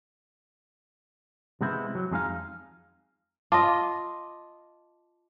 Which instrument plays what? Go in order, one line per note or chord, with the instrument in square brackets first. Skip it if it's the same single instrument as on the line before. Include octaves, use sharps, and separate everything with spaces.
[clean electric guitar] C3 G#3 B3 C4 E4
F#3
F2 G#3 D#4 F5
[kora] F4 D#5 [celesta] A5 D6